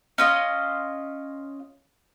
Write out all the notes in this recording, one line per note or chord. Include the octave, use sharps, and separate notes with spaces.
C#4 F4 D#5